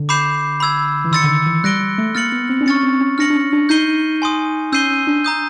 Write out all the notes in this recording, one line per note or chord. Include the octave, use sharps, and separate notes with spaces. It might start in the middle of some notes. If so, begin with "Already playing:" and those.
Already playing: D3
B5 D6 G6 C7 E7
B5 E6 G#6
E3
D#3 C6 E6 A6 C#7
D3
D#3
E3
G3 F#6 A#6 D7 G7
G3
A3
A#3 F6 A6 C#7 F#7
B3
C4
D4
C#4 C#6 F6 A6 C#7
C4
C#4
D4 F6 A#6 C#7 F#7
D4
C#4
D4
D#4 G6 C7 D#7 G7
G#5 C6 D#6
C#4 E6 G6 C7 D#7 G7
C#4
D4
A#5 D#6 G6